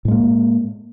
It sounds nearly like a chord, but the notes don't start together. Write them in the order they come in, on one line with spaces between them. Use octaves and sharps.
A2 G#3 A#3